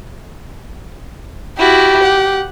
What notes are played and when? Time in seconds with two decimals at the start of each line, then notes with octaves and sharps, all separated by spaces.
1.59 E4 F#4 G4
2.02 F#5